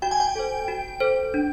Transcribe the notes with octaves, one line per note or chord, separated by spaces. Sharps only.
F#4 G5
G#5
G5
A4 C5
F#4
A4 C5
D4